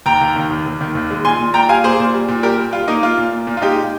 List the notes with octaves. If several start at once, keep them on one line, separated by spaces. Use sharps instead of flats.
D#2 G5 A#5
D#2
D#3
D#2
D#2
D#3
D#2
G#3
A#2 G#5 C6
A#2
A#2 G5 A#5
G3 F5 G#5
A#3 G#4 C5
A#2
G3
A#2
G3 G4 A#4
G3
G3 F4
A#3 D#4
A#3 F4
A#2
A#3
A#2
F4
G#3 D#4 G4